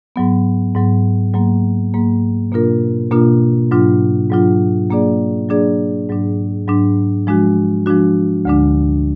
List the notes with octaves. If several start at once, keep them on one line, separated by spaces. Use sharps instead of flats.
G#2 F#3 B3
G#2 F#3 B3
G#2 F#3 A#3
G#2 F#3 A#3
B2 A#3 D4 F4 A#4
B2 A#3 D4 F4 A#4
G#2 F#3 D4 F4
G#2 F#3 D4 F4
F#3 A#3 D4 G#4 D5
F#3 A#3 D4 G#4 D5
G#2 F#3 D4
G#2 F#3 D4
F3 G#3 D4 F#4
F3 G#3 D4 F#4
D2 D3 G#3 D4